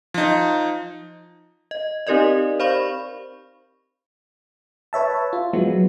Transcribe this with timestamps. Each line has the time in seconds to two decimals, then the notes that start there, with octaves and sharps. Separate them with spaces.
0.14 F3 D#4
1.71 D#5
2.07 C4 D#4 G4 A#4 D5 D#5
2.60 C5 D5 F5 B5 C#6
4.93 B4 C#5 E5 A5
5.33 F4
5.53 F3 F#3 G#3 B3 E4